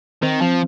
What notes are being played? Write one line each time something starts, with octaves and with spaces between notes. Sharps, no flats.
D#3 C4
F3